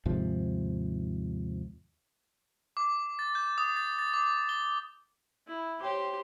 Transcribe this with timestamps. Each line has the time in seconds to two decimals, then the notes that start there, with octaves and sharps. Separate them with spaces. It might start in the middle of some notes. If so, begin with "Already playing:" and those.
0.06 D#2 G#2 C3 F3
2.77 D6
3.19 A6
3.35 G6
3.58 D#6
3.76 A6
3.99 A6
4.14 D6
4.49 G7
5.47 E4
5.80 G4 C5 C#5 G5 D6